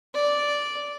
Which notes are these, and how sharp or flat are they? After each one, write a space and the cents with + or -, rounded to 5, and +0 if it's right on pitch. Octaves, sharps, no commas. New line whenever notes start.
D5 -5